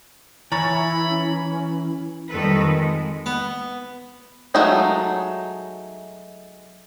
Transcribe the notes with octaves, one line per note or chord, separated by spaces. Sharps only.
E3 C#5 G#5 A#5 B5 A6
E4
C#4
F2 D#3 G3 A4 B4
G#3
B3
F#3 G#3 A3 D#4 F4